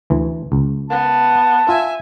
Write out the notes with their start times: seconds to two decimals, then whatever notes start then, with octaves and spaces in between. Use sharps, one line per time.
0.10 D2 E3
0.52 C#2
0.90 B3 A5
1.69 F4 E5 G#5